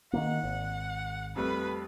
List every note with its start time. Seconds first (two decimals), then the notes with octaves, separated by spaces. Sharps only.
0.13 D#3 E3 A#3 F#5
0.44 G#1
1.36 F2 G3 A3 B4